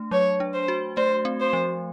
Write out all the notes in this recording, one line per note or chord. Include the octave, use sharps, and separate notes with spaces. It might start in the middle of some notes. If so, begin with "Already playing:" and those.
Already playing: A3 D4
F#3 C#5
D4
C5
F#4
A3 C5
C4
C5
F3